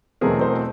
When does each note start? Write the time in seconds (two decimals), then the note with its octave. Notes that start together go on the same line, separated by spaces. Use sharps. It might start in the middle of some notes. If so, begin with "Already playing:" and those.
0.21 E2 B2 F#3 A3 C4 G#4 A#4
0.41 A#4 C5